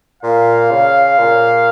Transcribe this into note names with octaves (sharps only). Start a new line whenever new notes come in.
A#2 F5
C#3
A#2